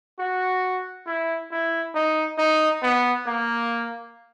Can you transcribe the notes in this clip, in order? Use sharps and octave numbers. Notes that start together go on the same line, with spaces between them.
F#4
E4
E4
D#4
D#4
B3
A#3